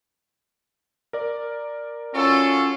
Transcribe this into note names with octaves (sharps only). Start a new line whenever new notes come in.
A#4 D5
C#4 F4 F#4 A4